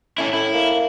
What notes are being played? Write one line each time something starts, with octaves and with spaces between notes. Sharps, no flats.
A2 C#4 E4
A2 E4
A#3